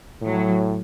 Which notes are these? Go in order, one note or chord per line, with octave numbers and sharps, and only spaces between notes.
A2 F#3